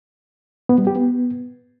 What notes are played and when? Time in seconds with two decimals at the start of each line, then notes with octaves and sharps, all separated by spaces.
0.69 B3
0.78 G3
0.87 G4
0.96 B3